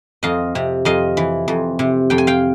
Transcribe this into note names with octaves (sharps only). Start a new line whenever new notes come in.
F2 D#5 F5
C3
F2 D#5 F5
E3
F2
C3
F2 G5
G#5
F5 G5